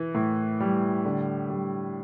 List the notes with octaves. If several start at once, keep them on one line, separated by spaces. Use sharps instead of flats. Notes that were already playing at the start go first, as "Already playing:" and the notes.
Already playing: E3
A2
G3
D3
G3